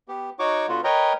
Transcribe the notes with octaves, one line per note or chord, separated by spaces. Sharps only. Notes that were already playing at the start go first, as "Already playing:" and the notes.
B3 G4
D#4 F#4 C#5 C#6 D6
D3 B3 F4 F#4
A#4 B4 C#5 D#5 G5 A#5